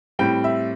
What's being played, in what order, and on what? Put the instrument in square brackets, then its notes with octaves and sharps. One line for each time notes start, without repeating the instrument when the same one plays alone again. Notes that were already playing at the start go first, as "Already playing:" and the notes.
[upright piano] A2 G3 C4 G5
E5